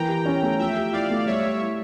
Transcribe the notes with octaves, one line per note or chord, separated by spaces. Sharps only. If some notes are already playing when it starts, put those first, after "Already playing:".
Already playing: E3 A#3 G5 A#5
G4
C#4
A3
F3 E5 G5
G4
E4 D5 F5
A3
G3 C#5 E5
G3
E4